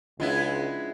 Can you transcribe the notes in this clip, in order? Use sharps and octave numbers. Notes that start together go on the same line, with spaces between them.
C#2 G#3 B3 C#4 D4 E4 F4